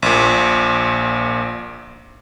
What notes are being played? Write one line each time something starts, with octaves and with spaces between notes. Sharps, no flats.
A#1 A#2